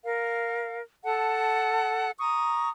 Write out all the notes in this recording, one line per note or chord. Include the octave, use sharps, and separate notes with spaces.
A#4 F5
A4 F#5 A5
A#5 C#6 D#6